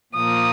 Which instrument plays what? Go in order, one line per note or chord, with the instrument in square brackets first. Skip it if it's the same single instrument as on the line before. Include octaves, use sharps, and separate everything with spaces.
[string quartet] A#2 F3 A#3 D#6